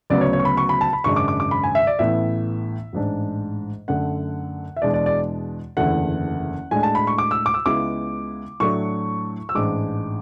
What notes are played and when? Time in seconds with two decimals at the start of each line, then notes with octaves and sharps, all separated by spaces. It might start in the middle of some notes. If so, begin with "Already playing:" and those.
0.10 D2 C#3 F#3 B3 D5
0.21 C#5
0.33 C#5
0.39 C#6
0.45 B5
0.57 C#6
0.69 B5
0.81 A5
0.93 B5
1.04 G#1 F#2 C#3 G#3 D4 C#6
1.16 D6
1.28 D6
1.40 D6
1.51 B5
1.64 G#5
1.75 E5
1.87 D5
1.99 A1 A2 E3 B3 E4 E5
2.93 A1 G#2 G#3 D4
3.88 F#2 D3 A3 F#5
4.77 E5
4.82 E2 B2 G#3 D4 D5
4.94 D5
5.06 D5
5.77 F#1 E2 D3 A3 E4 F#5
6.71 A2 G#3 D4 G#5
6.83 A5
6.95 B5
7.07 C#6
7.18 D6
7.31 E6
7.46 D6
7.54 E6
7.65 C#2 C#3 G#3 B3 E4 D6
8.60 A2 F#3 A3 D4 C#6
9.49 E6
9.55 A1 G#2 G#3 D4 D6